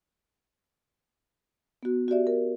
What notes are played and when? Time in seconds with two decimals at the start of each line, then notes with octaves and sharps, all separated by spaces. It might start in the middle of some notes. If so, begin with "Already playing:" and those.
1.83 B3 F#4
2.08 F#4 G4 D5 E5
2.27 A#4